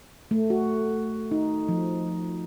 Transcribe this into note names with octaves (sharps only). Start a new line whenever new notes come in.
A3
F#4
D#4
F3